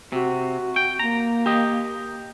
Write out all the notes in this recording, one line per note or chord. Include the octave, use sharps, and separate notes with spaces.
C3 F#4
G5
A#3 A#5
G4 D#5